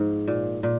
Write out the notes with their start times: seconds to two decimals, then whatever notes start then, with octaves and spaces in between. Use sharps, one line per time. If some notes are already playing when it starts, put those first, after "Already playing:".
Already playing: G#2 F3
0.28 A#2
0.63 A#2